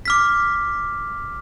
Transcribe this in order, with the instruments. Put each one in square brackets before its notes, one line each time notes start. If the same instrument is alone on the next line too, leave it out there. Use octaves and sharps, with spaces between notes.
[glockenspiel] D6 F6 B6